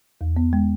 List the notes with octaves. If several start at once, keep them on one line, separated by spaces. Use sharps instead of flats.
E2
B3
G#3